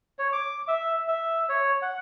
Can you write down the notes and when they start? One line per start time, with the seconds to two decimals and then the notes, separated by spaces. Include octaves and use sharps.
0.19 C#5
0.33 D6
0.68 E5
1.08 E5
1.49 C#5
1.82 F#5